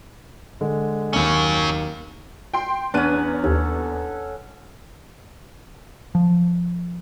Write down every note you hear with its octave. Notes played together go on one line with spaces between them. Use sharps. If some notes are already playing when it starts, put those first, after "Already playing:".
D3 G#3
D#2 F#3 C#4 C#6 C#7
G5 C6
E2 C#4 D4 F#5 D#7
D#2 A4
F3